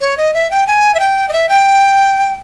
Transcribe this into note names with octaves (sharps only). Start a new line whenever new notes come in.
C#5
D#5
E5
G5
G#5
E5
G5
D#5
E5
G5